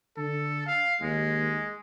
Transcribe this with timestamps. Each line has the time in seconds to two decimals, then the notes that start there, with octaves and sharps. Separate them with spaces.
0.17 D3 A4
0.67 F5
1.01 D#2 G#3